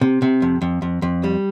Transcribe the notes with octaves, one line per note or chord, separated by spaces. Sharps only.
C3
C3
F2
F2
F2
F2
G3